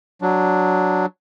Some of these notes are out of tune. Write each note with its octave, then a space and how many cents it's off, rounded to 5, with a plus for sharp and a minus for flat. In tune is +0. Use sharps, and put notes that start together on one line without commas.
F#3 +0 D4 +0